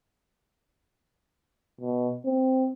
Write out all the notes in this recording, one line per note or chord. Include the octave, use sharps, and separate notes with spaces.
B2
C4